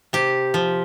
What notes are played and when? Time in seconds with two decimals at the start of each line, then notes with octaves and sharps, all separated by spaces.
0.13 C3 G4
0.54 F3